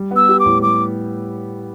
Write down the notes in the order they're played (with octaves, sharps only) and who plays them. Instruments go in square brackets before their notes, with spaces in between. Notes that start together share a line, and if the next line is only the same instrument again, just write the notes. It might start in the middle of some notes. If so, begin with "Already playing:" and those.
Already playing: [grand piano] G3
B3
[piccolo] E6
[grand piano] G4
[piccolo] D6
[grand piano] A2
[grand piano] G3 [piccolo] D6